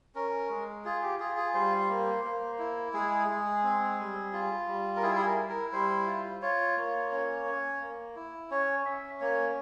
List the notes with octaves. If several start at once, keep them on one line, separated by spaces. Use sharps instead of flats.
C#4 A#4
G#3
F4 G#4
G4
F4 G#4
G#4
G3 C5
A#3
A#3
E4
G#3 G#4
G#3
C4
G3
F4
G3
A#4
E4 G#4
G#4
A#4
E4
A#4
G3 C5
F4
F4 C#5
A#3
C#4
C#4
A#3
E4
C#4 C#5
C#4 E5
A#3 C#5